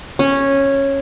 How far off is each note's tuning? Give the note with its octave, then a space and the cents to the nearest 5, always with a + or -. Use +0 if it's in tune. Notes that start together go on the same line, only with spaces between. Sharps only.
C#4 -10